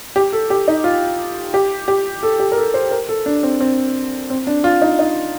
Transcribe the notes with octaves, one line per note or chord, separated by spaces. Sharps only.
G4
A4
G4
D#4
F4
G4
G4
A4
G4
A#4
A4
C5
A#4
A4
D4
C4
C4
C4
D4
F4
D#4
D#4